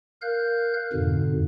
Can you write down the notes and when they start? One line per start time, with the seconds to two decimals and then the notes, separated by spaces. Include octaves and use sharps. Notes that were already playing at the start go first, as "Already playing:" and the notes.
0.22 A#4 F5 F#6 G6
0.93 F2 G#2 B2 D3